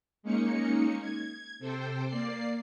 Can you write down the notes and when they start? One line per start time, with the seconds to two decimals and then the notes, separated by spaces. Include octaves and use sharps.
0.23 G#3 A#3 C#4 D#4 C#7
1.01 G#6
1.59 C3 A4 C5 G5
2.07 A#3 D5 C7